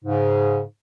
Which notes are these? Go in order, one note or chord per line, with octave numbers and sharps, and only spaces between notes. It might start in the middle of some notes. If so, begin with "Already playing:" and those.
G#2 C#3